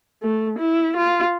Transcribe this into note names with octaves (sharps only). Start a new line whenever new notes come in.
A3
E4
F4